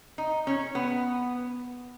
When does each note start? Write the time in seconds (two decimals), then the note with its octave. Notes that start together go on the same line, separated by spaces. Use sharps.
0.18 D#4
0.47 C#4
0.75 B3